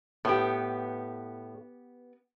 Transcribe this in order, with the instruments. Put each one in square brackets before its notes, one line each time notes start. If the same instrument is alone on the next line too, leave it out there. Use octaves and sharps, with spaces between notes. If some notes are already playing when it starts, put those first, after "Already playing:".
[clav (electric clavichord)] A2 [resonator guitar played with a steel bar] B3 G4